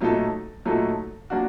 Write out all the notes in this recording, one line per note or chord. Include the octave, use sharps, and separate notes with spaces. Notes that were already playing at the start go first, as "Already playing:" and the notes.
A#2 F#3 A3 D#4 A4
A#2 F#3 A3 D#4 A4
F#3 A#3 D4 F#4